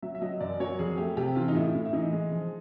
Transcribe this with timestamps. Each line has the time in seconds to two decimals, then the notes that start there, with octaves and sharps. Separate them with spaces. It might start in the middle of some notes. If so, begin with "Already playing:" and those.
0.02 F#3 E5
0.15 E5
0.22 F#3 D#5
0.40 F#2 D5
0.60 F#3 C#5
0.79 F2 G#4
0.98 A3 G4
1.17 C3 G4
1.36 E3 F4
1.48 D#4
1.55 A2 E4
1.74 A2
1.85 E4
1.93 E3 D#4
2.12 G#3
2.31 F3